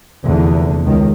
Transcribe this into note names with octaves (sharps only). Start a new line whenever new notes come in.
F1 E2 D3
C#2 D#3